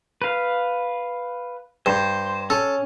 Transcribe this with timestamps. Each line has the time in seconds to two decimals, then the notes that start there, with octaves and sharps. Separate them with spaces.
0.22 B4 F5
1.86 G2 C5
2.50 C#4 A4